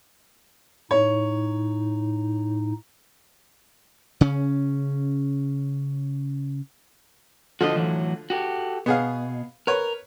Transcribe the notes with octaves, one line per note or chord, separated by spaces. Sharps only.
A2 D#4 C#5
C#3 C#4
D3 F3 F#4 C5 D#5
A2 E3 F#3
F#4 G4 A4
B2 B3 G#4 F5
A#4 B4 C#5